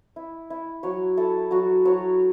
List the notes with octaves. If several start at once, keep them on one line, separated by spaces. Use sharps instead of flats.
E4
E4
F#3 C#5
E4 A4
F#3 F#4
F#3 C#5